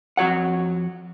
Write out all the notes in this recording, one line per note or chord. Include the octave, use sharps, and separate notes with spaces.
F2 F#4 C#5 F#5